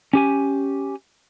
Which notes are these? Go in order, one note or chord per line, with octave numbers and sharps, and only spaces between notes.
C#4 G4 G#5